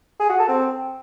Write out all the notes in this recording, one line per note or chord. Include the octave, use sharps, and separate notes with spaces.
G#4
F#4
A4
C4